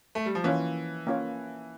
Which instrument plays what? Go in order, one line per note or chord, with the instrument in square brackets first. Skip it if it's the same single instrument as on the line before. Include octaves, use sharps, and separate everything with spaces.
[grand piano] A3
G3
F3
[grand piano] E3 [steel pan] A#3 C#4 F4 C#5
[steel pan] A#3 C#4 F4 C#5